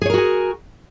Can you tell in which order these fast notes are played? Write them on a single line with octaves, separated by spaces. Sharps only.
G#4 C#5 A#4 F#4 G#5